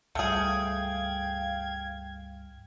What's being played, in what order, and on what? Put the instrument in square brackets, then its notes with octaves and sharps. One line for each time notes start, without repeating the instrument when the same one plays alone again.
[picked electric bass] C#2 G2 G3 [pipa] A3 G#4 [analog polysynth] F5 G5 G#6